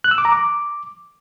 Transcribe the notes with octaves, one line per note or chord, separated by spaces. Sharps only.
F#6
E6
D6
A#5
D6